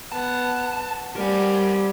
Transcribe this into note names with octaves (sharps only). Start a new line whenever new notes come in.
B3 F#5 A5
G3 C4 A#4 F#5 G#5